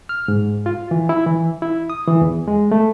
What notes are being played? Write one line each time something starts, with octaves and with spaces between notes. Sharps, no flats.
F6
G#2
F4
E3
E4
E3
E4
D#6
E3
E2
G#3
A3